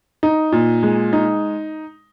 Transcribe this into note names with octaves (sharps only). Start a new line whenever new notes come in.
D#4
A#2
G#3
D#4